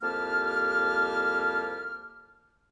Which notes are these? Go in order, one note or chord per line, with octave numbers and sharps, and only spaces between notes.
C2 F2 A#3 G4 A5 F6